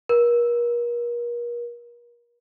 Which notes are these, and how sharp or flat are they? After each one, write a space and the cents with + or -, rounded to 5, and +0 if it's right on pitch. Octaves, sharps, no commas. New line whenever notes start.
A#4 +40